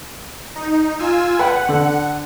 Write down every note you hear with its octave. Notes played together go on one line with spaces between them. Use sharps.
D#4
F4 G#5 E6
B4 F#5 G5 B5
D3 A4